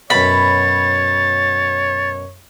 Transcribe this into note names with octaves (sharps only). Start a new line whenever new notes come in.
F#2 B2 C#5 B5 A6